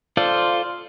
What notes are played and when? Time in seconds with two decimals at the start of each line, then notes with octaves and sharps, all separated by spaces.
0.17 F4 A4 C5 D5